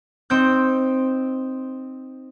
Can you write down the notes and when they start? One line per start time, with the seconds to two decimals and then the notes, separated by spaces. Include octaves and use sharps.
0.30 C4 D#4 G6